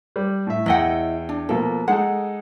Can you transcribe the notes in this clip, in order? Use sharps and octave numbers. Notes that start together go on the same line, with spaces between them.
G3
A2 E5
E2 E4 D#5 F#5 G5
D4
B2 F3 A#3 A4
G#3 D#4 A4 F#5